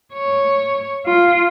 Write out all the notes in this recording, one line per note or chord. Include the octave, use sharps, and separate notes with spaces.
C#5
F4